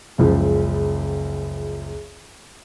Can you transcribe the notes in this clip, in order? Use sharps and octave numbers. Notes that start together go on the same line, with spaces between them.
F#1 C#2 F3